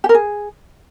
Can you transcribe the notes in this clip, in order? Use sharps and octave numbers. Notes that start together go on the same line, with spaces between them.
G4
A#4
G#4